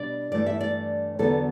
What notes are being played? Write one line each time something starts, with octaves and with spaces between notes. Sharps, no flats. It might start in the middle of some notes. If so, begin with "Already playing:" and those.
Already playing: B2 G3 D4 D5
G2 E3 A3 D4 D5
E5
D5
E2 D3 F#3 B3 A4